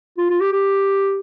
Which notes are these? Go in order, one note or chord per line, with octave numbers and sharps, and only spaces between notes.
F4
F4
G4
G4